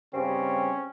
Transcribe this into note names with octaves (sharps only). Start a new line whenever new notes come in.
G2 C#3 G3 C4 C#4